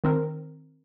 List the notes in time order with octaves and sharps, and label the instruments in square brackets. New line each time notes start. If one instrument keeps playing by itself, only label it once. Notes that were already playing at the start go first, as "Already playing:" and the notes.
[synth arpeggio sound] D#3 C4 A#4